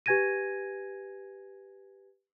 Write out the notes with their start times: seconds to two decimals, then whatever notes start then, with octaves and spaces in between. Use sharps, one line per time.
0.06 G4 B4 G#5 G#6 A#6 D#7